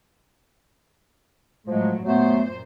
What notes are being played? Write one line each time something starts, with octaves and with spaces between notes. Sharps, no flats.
A2 F3 F#3 G#3
F#2 A#2 F#3 A3 B3 C5